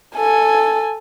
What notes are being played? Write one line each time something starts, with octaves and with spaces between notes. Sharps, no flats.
A4 G#5